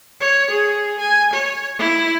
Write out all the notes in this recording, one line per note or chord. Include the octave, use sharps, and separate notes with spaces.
C#5
G#4
G#5
C#5
E4